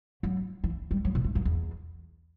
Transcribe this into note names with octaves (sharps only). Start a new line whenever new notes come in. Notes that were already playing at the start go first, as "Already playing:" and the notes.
F#3
E3
G3
F#3
B2
G2
F#2
E2